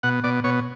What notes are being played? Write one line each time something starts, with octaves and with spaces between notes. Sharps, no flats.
B2 F#5
B2 D5
B2 C#5